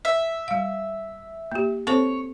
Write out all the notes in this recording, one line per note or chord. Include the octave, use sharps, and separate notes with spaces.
E5
G3 F5
A#3 G4
C4 A4 C5 C#5